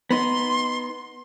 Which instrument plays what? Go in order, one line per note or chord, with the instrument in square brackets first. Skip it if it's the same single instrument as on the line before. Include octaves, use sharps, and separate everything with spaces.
[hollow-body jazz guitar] B3 D#4 [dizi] C6